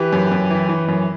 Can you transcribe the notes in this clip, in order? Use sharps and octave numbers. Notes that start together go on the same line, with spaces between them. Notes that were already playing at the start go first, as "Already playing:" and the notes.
Already playing: E3 G4 B4
F#2
F#2
E3
E3
F#2